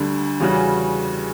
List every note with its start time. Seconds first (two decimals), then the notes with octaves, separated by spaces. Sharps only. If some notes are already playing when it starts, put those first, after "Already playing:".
Already playing: D2 D3 G3
0.40 E2 C#3 G3 C#4 F#4